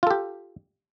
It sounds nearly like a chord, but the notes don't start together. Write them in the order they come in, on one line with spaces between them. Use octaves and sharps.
F4 A4 G4